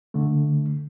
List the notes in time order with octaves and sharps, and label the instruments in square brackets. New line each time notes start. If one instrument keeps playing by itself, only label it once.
[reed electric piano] D3 A3